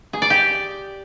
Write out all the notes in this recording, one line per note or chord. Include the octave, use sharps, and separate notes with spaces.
G#4
D5
G4